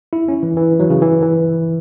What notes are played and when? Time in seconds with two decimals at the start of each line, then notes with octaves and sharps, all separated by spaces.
0.13 E4
0.28 C#4
0.43 E3
0.57 E3
0.80 F#3
0.90 C#3
1.02 E3
1.22 E3